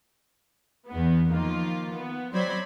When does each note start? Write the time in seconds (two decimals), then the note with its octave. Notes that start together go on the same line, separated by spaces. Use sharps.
0.88 E2 B3
1.30 D#3 F3 A#3 F4
1.94 B3
2.33 F#3 C4 C5 D5 B5 G#6